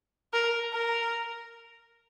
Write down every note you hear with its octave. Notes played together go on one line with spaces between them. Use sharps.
A#4
A#4